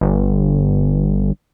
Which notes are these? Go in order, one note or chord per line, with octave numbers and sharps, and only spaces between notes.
G1